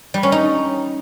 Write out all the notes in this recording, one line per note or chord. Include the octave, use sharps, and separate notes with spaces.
G3
C#4
D#4